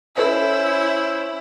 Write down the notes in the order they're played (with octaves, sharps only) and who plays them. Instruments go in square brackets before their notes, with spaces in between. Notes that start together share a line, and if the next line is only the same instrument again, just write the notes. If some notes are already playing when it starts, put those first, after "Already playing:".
[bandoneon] C#4 C5 [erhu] E4 [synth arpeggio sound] A4 B4 D#5